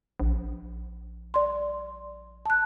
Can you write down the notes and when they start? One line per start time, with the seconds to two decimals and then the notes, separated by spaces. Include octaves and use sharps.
0.20 A#1
1.34 D5 C6
2.46 A5 F#6